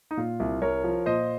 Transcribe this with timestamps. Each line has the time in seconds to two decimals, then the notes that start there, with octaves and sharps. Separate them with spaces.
0.11 D#4
0.17 A#2 F4
0.40 C2
0.61 C2 A#4 C#5
0.84 F3
1.06 A#2 C5 D#5